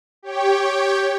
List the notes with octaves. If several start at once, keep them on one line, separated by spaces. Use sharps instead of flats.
G4 C#5 G5